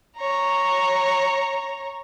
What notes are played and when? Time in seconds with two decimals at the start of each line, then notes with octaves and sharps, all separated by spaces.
0.17 C#5 A#5